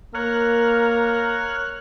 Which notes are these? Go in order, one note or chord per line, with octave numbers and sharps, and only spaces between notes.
A#3 A#4 C#5 F6 F#6